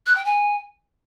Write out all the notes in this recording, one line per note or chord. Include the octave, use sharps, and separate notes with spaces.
F#6
G5
G#5